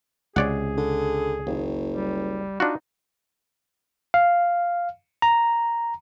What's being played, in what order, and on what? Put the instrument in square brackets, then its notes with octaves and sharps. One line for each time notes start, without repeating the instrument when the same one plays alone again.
[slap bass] C#2 C3 [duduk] G#4 [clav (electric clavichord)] C#5 D5 F#5
[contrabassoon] D3
[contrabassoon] F#1 [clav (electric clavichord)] D#2
[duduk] G3
[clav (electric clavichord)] D4 F4 F#4 [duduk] D#4
[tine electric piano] F5
A#5